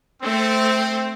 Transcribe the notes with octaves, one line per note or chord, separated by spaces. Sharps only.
A3 C4